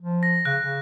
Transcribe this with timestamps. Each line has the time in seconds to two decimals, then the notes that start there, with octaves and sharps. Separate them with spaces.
0.02 F3
0.23 A#6
0.45 C#3 F#6
0.63 C#3